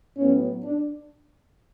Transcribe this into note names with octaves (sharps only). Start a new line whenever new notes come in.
A2 F#3 B3 C#4
D4